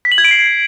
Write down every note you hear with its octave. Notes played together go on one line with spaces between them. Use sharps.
B6
F#7
G#6
D7
C7